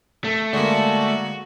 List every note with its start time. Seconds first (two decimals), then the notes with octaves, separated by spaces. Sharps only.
0.24 A3
0.53 D3 G#3 A#3 F#4 D5